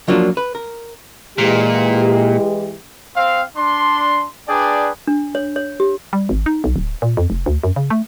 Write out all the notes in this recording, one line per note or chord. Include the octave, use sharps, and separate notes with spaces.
F3 F#3 A#3 D4 F4
B4
A#4
A#2 E3 G#3 G4
C4 F5
D4 C6
D4 G#4 B4 D5 G5
D4
C#5
C#5
G4
G3
G#1
D#4
B1
D1
A#2
F2
F1
D2
F#2
C#3
A3